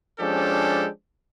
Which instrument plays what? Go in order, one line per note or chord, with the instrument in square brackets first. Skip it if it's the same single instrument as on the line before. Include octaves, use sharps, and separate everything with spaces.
[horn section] F3 G#3 C#4 D4 G4 A4